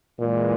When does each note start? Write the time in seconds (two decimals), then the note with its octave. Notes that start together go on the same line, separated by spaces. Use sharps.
0.19 A#2 E3 G#3